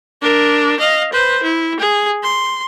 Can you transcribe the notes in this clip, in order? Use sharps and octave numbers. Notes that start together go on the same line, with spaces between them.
D4 A#4
D#5 F5
B4 C5
E4
G#4
C6